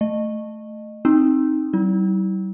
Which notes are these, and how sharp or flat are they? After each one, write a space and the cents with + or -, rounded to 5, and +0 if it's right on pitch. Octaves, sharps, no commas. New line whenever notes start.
A3 +0 D#5 -25
C4 +20 D#4 +0
G3 -45 E4 -30